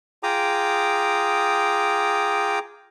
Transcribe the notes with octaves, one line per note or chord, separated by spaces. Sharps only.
F4 G#4 G5 A#5 D6 D#6